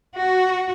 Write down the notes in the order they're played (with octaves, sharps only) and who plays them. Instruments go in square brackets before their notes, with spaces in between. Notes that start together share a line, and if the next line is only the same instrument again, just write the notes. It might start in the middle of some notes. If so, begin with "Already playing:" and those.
[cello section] F#4